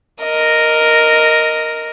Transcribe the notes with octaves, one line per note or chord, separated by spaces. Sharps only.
A#4 D#5